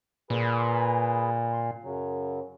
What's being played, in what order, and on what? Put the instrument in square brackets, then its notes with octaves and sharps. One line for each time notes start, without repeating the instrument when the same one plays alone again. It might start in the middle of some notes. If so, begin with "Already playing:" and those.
[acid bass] A#2 [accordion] G#4 B4
[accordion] C6
F#2 C#3 F#3